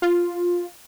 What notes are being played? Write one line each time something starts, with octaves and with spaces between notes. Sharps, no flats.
F4